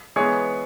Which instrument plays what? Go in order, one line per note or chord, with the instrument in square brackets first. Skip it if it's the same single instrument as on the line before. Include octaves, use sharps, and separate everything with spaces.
[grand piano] E3 G#3 B3 G#4 C#5